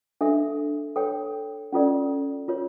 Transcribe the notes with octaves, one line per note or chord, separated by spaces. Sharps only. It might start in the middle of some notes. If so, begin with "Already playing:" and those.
D4 A4 E5
A4 C#5 G5
C#4 F4 A4 D5
F4 A#4 C#5